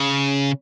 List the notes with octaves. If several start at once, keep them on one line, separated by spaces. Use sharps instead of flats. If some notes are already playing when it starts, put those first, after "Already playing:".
Already playing: C#3